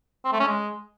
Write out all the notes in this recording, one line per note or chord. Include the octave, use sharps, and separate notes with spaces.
C4
A3
C#4
G#3